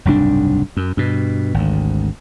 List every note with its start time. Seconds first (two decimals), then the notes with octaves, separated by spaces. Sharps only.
0.05 F#1 C2 G#2 D4
0.77 F#2
0.97 G2 B2
1.54 G#1 D2